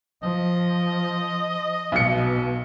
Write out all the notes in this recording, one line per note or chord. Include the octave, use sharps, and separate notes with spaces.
F3 D#5
B1 B2 C#7